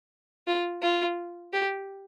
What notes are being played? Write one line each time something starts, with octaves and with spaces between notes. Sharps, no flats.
F4
F4
G4